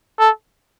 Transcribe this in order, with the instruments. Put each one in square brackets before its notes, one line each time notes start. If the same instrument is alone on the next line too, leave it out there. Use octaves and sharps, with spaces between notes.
[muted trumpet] A4